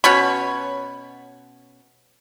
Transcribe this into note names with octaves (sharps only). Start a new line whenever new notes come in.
B2 C#4 C#5 B5